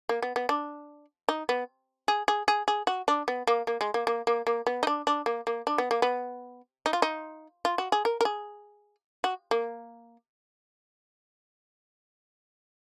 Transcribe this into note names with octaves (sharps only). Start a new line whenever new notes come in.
A#3
B3
B3
D4
D#4
B3
G#4
G#4
G#4
G#4
F#4
D4
B3
A#3
A#3
G#3
A#3
A#3
A#3
A#3
B3
D#4
D4
D4
A#3
A#3
D4
B3
A#3
B3
D#4
F4
D#4
F4
F#4
G#4
A#4
A#4
G#4
F#4
A#3